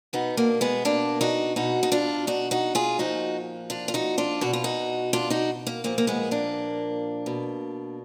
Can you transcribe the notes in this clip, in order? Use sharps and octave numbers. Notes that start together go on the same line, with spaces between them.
B2 B3 D#4
A#3 D4
G#3 B3
A#3 D4
D#4 F#4
B2 D#4 F#4
D#4
D4 F4
D#4 F#4
D#4 F#4
F4 G#4
A#2 F3 D#4 F#4
D4 F4
F4
D#4 F#4
D4 F4
B2 F#4
F4
D#4 F#4
D4 F4
D#4 F#4
A#3
A#2 F3 A#3
A#3
G#3 B3
A#3 D4
B2